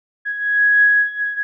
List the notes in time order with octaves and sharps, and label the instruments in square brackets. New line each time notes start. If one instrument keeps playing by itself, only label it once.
[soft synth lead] G#6